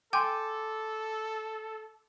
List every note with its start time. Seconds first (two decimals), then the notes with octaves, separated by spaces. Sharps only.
0.13 A4 G5 G#5 C6 D6 G6